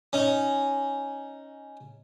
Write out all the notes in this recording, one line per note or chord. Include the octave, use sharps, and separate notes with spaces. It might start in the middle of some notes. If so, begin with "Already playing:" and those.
C#4 D#4